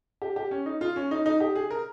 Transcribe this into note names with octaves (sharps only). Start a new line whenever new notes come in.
G4
G4
C#4
D#4
F4
C#4
D#4
D#4
G4
G#4
A#4